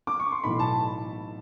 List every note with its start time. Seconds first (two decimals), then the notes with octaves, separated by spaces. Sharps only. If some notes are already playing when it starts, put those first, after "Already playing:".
0.07 D6
0.20 C#6
0.32 C6
0.44 B1 A2 E3 B5
0.59 A5